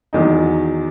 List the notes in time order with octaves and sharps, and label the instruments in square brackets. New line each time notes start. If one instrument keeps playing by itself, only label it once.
[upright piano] E2 D#3 F#3 D#4